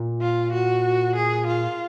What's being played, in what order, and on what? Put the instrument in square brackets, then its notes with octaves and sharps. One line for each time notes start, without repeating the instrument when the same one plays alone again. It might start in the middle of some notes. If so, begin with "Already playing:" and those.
Already playing: [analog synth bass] A#2
[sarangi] F4
F#4
G#4
F4